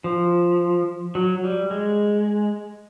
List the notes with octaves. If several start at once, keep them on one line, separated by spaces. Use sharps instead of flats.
F3
F#3
G3
G#3